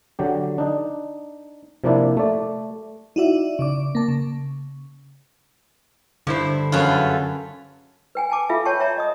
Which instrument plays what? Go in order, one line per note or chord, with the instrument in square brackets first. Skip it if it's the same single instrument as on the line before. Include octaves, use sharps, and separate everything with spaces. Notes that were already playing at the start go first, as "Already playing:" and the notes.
[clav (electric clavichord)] D3 F#3 G4
D4 D#4
C3 F3 A#3 D4 E4 D5
A3 D5
[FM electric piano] D#4 E4 F#4 D5 E5
C#3 D5 D6
A#3 A5
C#3
[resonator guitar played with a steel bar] G2 E4 C5 [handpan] D3
[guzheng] F#2 F4 [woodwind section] C#3 A4 B4
[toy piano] B4 G5 G#5
G#5 A5 D6
F4 A4 B4 E5 F5
C#5 G5 A5 C#6
C#5 E5 A#5
D#5 D#6